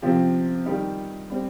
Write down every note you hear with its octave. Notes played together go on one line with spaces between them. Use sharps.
C3 F3 C4 G4
D#3 G3 D#4 G4
G3 C4